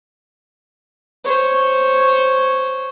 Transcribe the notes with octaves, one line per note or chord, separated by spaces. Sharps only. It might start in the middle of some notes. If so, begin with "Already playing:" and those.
C5 C#5